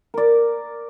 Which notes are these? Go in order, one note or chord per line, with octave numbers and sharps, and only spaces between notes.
A#4 D5